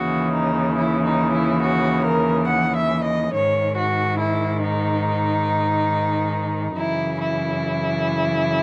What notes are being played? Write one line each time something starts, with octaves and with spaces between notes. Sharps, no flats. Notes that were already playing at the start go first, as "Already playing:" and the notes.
Already playing: D#2 C#3 E3 F#4
D#4
E4
D#4
E4
F#4
A#4
F#5
E5
D#5
G#2 D#3 C#5
F#4
E4
D#4
F#2 C#3 E3 E4
E4